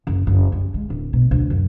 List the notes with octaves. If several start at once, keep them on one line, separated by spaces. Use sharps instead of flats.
F#1
F#1
G3
G#3
D1
B2
D2
F#2